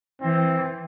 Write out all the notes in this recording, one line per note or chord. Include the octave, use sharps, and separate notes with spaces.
E3 C4